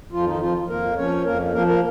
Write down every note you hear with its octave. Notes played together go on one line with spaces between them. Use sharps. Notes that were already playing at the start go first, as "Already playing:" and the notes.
F2 F3 F4
D#3 D#4
F3 F4
F2 A#3 A#4
F3 C#4 C#5
F2 A#3 A#4
F3 A#3 A#4
A#3 A#4